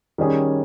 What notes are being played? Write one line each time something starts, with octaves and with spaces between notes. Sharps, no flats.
D#3 G3 C#4 G#4